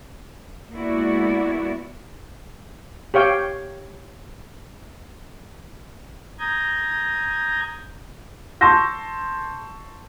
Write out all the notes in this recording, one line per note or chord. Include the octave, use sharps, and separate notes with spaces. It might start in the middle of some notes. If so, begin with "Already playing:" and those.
G#3 A#3 B3 E4 F#4 D5
G4 C#5 F5 G5
A#5 D#6 G6 G#6
A5 C6 C#6 E6 G6 A#6